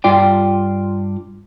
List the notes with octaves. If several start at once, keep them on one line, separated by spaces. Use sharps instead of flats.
G2 F4 D5 G5